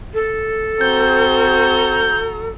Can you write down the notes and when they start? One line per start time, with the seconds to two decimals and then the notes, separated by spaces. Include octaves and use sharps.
0.14 A4
0.81 C4 F#4 A#5 G6